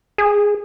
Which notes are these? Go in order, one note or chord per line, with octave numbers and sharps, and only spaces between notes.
G#4